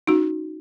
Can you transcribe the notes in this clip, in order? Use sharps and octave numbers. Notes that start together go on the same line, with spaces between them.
C#4 D#4 F#4